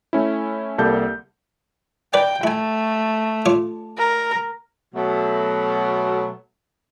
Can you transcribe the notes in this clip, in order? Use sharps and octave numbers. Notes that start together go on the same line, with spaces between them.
A3 C#4 E4
C2 G3 A#3 A4 A5 G6
B4 D5 G5 G#5
A3 E4 G#5
F4 C#5 D6
A#4
B2 F#3 A3